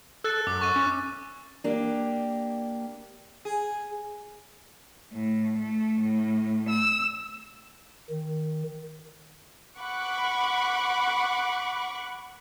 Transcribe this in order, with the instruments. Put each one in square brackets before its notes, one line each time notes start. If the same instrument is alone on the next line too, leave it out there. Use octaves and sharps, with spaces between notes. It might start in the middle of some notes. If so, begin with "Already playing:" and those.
[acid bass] A4 [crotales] E6 F#6 A6
[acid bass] F#2 [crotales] D6
[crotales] C#6 A6 D#7
[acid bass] C#4
[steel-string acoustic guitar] A#3 D4 G4
[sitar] G#4
[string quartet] A2
A3
A2
E6
[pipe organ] D#3
[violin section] F#5 B5 C#6 D6 F#6